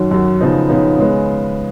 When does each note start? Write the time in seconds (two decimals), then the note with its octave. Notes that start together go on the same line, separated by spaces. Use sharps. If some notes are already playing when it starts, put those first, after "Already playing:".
Already playing: F#2 D#3 F#3
0.11 F#2 D#3 F#3
0.41 C#3 F3 B3 D#4
0.69 C#3 F3 B3 D#4
0.98 C#3 G#3 B3